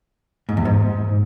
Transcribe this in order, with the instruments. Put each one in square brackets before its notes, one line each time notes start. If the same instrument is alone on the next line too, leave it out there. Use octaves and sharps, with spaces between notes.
[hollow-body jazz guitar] G#2
E2
G#2